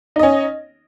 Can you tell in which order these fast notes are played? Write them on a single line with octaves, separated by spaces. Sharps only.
D#4 D#5 C#4